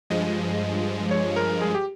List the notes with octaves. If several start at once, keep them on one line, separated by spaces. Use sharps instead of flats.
G2 F3 G#3 D#5
C#5
A#4
G#4
G4